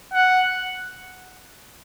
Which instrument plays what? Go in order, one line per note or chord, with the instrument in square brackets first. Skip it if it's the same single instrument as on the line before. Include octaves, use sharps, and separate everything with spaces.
[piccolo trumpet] F#5